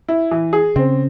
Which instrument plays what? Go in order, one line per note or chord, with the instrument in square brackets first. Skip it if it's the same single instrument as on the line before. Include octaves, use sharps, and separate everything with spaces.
[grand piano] E4
E3
G#4
[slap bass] C#3 [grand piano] C4